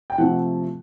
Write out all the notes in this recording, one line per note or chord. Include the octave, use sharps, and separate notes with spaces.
G5
C3 F3 A3 F#5